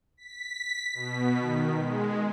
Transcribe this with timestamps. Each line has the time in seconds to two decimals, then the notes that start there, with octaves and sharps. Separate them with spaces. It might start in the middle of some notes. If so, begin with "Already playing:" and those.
0.17 B6
0.94 B2
1.41 D#3
1.75 G#3